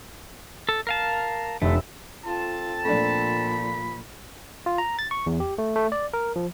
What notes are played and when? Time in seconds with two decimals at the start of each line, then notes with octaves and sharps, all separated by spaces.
0.69 A4
0.87 A#4 F5 A5
1.62 F1 A3 E6
2.25 C4 F4 A4 A5
2.85 A#2 F3 A3 D4 B5
4.66 F4
4.78 A#5
4.99 A6
5.11 C#6
5.26 E2
5.40 G4
5.58 A3
5.76 A3
5.92 D5
6.14 A#4
6.36 F3